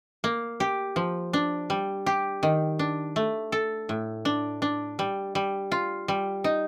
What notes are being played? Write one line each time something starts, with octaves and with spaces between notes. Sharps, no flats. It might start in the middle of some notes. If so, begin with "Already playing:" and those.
A#3
G4
F3
D4
G3
G4
D#3
D4
A3
A4
A2
D4
D4
G3
G3
F4
G3
D#4